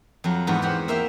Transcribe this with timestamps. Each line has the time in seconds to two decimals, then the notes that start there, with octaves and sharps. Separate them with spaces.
0.24 F2 F#3
0.47 E2 G#2 B3 F#4
0.62 G4 C5 C#5 F#5
0.88 A#3 E5 F5 G5